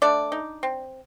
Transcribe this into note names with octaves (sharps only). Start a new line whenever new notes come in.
A3 D4 D5
D#4
C4